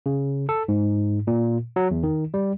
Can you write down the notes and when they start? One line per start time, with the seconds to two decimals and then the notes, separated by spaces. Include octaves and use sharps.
0.06 C#3
0.49 A4
0.68 G#2
1.27 A#2
1.76 F#3
1.91 E2
2.03 D#3
2.34 G3